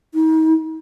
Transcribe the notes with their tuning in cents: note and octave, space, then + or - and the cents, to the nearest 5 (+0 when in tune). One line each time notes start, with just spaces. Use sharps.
D#4 +40